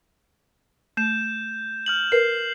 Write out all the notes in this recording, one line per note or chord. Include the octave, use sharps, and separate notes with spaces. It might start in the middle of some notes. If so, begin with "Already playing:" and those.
A3 G6 E7
F6 G6 F#7
A#4 B4 C7